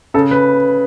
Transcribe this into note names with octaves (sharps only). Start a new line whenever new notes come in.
C#3 A4
B4